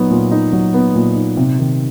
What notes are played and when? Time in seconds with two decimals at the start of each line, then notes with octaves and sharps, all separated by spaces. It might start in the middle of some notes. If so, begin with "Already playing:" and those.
Already playing: A#2 F#3 B3 D#4
0.11 A#2
0.32 D#4
0.53 F#3
0.74 B3
0.95 A#2
1.16 D#4
1.37 C3
1.59 D#3